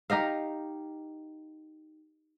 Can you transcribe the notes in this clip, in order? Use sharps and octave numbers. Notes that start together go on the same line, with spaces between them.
D#4 G4 D#5 F5